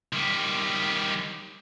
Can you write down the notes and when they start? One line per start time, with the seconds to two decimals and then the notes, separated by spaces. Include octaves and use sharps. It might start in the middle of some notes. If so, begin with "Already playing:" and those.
0.13 D#3 G3